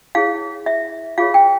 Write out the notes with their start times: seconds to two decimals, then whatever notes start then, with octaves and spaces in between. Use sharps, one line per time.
0.15 E4 G#4 C#5 F5
0.66 E5
1.18 F4 G#4 C#5 F5
1.34 G5